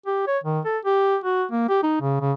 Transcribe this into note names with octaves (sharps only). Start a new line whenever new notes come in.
G4
C#5
D#3
A4
G4
F#4
A#3
G4
D#4
C#3
C#3